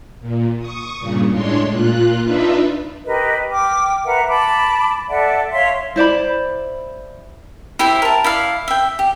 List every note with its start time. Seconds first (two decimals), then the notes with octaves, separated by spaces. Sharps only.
0.21 A#2
0.59 C#6 D#6
0.99 G2 A#2 C#3
1.29 A2 G#3 D4 C#5 C6
1.70 A#2 F4 F#6
2.24 D4 D#4 F4 B4 E5
3.07 G4 A#4 B4 D#5
3.51 G5 D6 F6
4.05 A#4 B4 E5 F#5
4.28 A5 B5 D6
5.10 A4 D5 E5 F#5
5.52 C#5 E5 F5 C6
5.96 E4 C5 D5 B5
7.79 E4 G4 C5 E5
8.02 A#4 A5
8.24 E4 D5 F5
8.68 E5 G5
8.99 G4